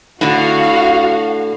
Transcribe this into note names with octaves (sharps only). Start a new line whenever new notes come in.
A2 D3 F#4 F5